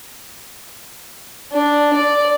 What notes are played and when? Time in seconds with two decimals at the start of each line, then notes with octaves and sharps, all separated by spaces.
1.52 D4
1.93 D5